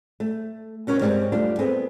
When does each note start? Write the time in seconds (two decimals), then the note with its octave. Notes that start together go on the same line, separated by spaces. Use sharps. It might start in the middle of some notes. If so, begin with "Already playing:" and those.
0.20 A3
0.87 B2 C#4 A#4 C#5
1.00 G2 E3 G3 G#3 C4 C#5
1.32 G3 A3 D4 F4
1.59 B3 C4 G#4 A4